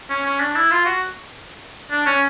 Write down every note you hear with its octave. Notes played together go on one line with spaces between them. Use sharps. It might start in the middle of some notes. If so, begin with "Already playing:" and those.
C#4
C#4
D4
E4
F4
F#4
D4
C#4